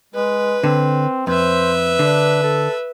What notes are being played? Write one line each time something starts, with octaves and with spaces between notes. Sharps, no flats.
G#3 B4
D3 C4
F2 B4 C5 E5
D3 D4
A4